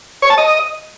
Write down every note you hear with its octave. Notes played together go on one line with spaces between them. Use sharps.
C#5
A5
D#5